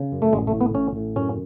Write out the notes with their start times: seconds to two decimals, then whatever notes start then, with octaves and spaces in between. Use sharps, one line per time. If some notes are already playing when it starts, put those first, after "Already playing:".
Already playing: C#3
0.12 F#2
0.22 A3
0.33 A1 G#3
0.47 A3
0.54 A2
0.61 B3
0.74 A1 C#4
0.96 A2
1.16 F#2 C#4